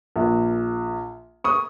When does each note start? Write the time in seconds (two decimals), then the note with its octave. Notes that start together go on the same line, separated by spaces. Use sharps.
0.16 A#1
1.44 C#6 D#6